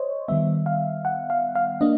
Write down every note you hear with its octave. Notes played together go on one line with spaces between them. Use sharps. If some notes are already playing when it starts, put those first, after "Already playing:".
Already playing: C5 C#5 D#5
D#3 G3 B3 E5
F5
F#5
F5
F5
A#3 D4 D#5